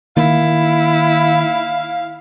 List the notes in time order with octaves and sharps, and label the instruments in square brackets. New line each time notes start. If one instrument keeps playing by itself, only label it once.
[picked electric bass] D#3 A#3 [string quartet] E4 [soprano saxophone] F5